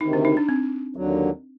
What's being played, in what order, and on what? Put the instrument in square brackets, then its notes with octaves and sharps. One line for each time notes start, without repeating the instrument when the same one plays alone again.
[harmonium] D2 C3 D#3 [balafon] D#4
[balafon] D4
D#4
D4
C4
[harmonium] D#2 D3 F#3